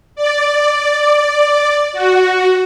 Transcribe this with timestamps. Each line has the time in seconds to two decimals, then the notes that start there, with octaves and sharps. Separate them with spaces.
0.15 D5
1.92 F#4